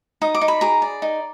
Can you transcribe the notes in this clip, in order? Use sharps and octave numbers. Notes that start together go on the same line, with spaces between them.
D#4 D#6
D6
D#4
B5
G#4 A#5 D6
D5
D#4